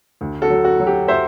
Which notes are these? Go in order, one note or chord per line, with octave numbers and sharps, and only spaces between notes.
D2
F#4 A4
F#3
F#4
F#3
G4
F#3 C5 E5